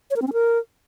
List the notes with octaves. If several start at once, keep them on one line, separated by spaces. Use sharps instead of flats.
C#5
A#4
C4
C#4
A#4